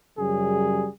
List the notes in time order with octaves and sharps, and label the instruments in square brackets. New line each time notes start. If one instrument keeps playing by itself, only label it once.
[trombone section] F#2 C#3 G3 [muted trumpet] G#4